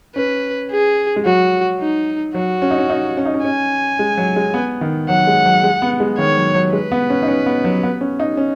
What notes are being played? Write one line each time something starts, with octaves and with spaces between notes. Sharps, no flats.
C#4 B4
G#4
G#3
F#3 F#4
D#4
F#3 F#4
C#4
D#4
C#4
D#4
C#4
D#4
C#4
C#4 G#5
G#3
F#3
G#3
B3
D#3
F#3 F#5
G#3
F#3
G#3
B3
G#3
D#3 C#5
F#3
F#3
G#3 B4
B3
C#4
D#4
C#4
B3
F#3
B3
C#4
D#4
C#4